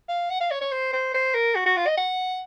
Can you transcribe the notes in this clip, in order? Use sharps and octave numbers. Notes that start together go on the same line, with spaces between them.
F5
F#5
F5
C#5
C#5
C5
C5
C5
A#4
F#4
F#4
F4
D#5
F#5